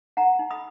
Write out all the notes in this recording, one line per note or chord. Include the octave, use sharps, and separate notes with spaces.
D#4 F#5 A#5
D#4
B5 D#6